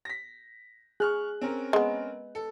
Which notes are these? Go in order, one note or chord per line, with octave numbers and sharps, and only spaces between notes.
A#6 B6
G#4 C#6 F6 F#6
C4 C#4 A#4
G#3 B3
A4